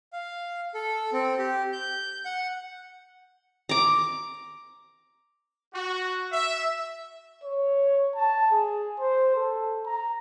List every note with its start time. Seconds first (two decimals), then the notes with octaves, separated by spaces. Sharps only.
0.13 F5
0.74 A4
1.13 C4
1.38 G4
1.73 G6
2.25 F#5
3.69 A#5 D6
5.74 F#4
6.31 E5
7.44 C#5
8.15 A5
8.51 G#4
8.99 C5
9.35 A4
9.86 A#5